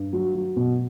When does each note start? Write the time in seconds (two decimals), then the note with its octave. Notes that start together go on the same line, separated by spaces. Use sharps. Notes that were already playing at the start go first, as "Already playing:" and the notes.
Already playing: G2
0.13 F#3
0.35 F#3
0.56 B2